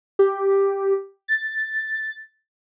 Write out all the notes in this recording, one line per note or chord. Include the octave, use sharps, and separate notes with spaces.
G4
A6